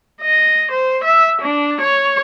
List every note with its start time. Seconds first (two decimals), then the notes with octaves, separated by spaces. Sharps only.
0.21 D#5
0.71 C5
1.04 E5
1.41 D4
1.81 C#5